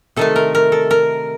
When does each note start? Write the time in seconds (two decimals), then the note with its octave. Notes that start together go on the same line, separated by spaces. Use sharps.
0.16 C3 D#3 A3 A4
0.36 A#4
0.55 A#4
0.72 A4
0.91 A#4